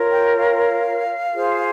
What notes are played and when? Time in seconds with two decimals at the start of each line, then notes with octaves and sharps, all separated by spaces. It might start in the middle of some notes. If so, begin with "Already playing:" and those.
Already playing: F4 A#4 C#5
0.11 G5
0.36 F5
1.33 F4 G#4 C5